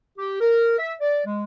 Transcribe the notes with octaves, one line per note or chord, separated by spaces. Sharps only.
G4
A#4
E5
D5
G#3